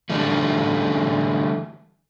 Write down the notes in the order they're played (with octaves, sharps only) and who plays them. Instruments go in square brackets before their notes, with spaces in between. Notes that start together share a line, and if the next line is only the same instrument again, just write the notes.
[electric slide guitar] D3 E3 G3 A3